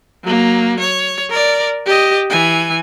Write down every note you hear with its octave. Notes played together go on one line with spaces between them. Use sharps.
F#3 A#3
C#5
A#4 D5
G4 D#5
E3 G#5